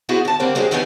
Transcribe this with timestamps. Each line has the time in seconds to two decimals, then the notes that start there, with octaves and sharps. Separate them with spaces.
0.09 B3 E4 F#4 G#4 C5
0.25 D#2 A5
0.40 G2 D3 G3 A#3 C4
0.55 F#3 G#3 A#3 G4 G#4
0.71 D#2 E3 G3 B3 D#4 G#5